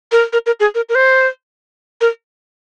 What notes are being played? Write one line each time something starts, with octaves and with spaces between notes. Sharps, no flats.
A#4
A#4
A#4
G#4
A#4
A#4
C5
A#4